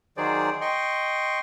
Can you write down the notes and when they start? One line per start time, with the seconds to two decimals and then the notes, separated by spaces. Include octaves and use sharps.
0.17 D#3 F#3 G#4 C5 D5
0.61 D#5 G5 C6 C#6